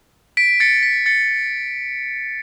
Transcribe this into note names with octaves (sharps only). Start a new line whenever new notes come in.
B6 D7
A6 C#7
B6
A6 C#7